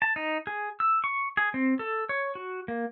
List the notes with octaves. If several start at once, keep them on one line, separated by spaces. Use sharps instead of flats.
A5
D#4
G#4
E6
C#6
G#4
C4
A4
C#5
F#4
A#3